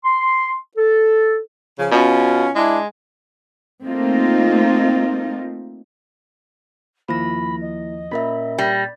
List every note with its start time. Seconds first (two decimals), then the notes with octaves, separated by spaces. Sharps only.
0.03 C6
0.76 A4
1.78 C#3 F3
1.91 B2 C#4 F4
2.55 G#3 D4 E4
3.84 A3 A#3 C4 D#4 F4
7.08 D#2 F3 A#3 E4 B5 A#6
7.61 D#5
8.11 A#2 C#4 A#4 E5 B5
8.58 G3 A#6